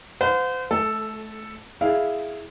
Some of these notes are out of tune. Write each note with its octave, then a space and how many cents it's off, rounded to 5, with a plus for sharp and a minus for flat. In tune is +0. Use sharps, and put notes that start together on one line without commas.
C5 -35 F#5 -40
A3 -25 A4 +0
E4 +0 G#4 +0 F5 +0